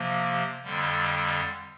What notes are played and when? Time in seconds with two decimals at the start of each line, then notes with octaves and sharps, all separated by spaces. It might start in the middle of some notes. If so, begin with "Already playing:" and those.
Already playing: C3 F3 A#3
0.63 F2 D3 G3